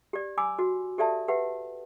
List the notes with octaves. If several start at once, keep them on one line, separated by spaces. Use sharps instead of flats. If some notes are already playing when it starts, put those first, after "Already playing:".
G4 D5
G#5 B5 D6 E6
F#4
G4 A4 D5 E5 A5
G4 B4 E5 F#5